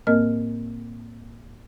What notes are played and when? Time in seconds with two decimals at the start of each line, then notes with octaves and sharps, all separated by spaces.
0.07 A2 A#3 C4 A#4 D#5 F6